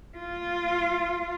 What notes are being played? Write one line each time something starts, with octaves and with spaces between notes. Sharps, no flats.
F4